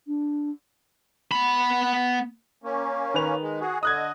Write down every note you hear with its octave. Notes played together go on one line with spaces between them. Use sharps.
D4
B3 B5
A#3 C#4
D#3 B4 F7
G#3
F#4 G#4
D3 D#5 D#6 F#6 G#6